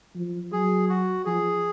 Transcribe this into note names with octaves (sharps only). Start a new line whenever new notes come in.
F3
F#3 G#4
F#4
F3 G#4